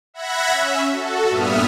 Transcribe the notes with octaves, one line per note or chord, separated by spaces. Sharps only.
E5 F#5 B5 F#6 G#6 A#6
C#4 E5
F#4 A4
G2 A#2 B3 E5 D#6 F6